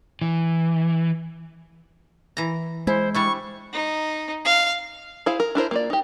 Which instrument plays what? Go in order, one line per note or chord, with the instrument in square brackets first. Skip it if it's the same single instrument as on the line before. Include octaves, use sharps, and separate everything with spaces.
[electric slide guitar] E3
[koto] E3 A#5
[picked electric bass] G#3 [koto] E4 [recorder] C5
[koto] G3 D4 E4 [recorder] C#6
[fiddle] D#4
F5
[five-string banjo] E4 G#4 C5 F5
A#4
D4 E4 A#4 C5
A#3 F4 D5
D#4 G4